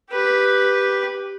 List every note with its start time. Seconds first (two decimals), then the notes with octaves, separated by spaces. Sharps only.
0.11 G4 B4